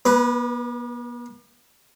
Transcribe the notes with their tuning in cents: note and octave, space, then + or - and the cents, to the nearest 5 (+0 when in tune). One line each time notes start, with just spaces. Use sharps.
B3 -45 B4 +0